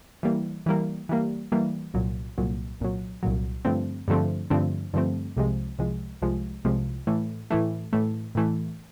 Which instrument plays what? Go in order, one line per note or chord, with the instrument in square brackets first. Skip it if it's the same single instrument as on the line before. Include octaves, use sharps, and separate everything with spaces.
[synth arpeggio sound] E3 G3 A#3
E3 G3 A#3
E3 G3 A#3
E3 G3 A#3
C2 A#2 F#3
C2 A#2 F#3
C2 A#2 F#3
C2 A#2 F#3
G2 D3 F3 A3 C4
G2 D3 F3 A3 C4
G2 D3 F3 A3 C4
G2 D3 F3 A3 C4
C2 C3 F3 G#3
C2 C3 F3 G#3
C2 C3 F3 G#3
C2 C3 F3 G#3
A2 E3 A3
A2 E3 A3
A2 E3 A3
A2 E3 A3